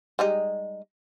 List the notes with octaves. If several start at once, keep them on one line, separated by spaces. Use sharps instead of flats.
G3 G#3 D#4